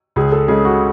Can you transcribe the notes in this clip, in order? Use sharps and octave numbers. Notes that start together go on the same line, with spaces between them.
C#2 G#4
A4
C#3 G#3 G#4
F#4